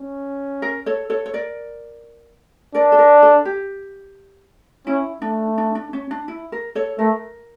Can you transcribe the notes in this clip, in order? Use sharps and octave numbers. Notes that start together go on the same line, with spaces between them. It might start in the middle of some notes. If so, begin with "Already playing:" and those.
Already playing: C#4
A#4
A4 C#5
A4 C#5
C#5
A#4 D5
D4 A#4 D5
A4
A#4
A4
G4
C#4 E4
A3 D4
D4
D4
C#4
D4
E4
A#4
A4 C#5
A3 A#4